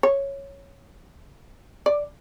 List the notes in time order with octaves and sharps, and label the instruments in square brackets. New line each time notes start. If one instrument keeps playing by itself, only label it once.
[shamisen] C#5
D5